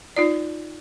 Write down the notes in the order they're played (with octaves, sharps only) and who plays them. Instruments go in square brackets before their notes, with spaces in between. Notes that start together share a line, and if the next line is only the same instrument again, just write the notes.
[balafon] D#4 F4 D5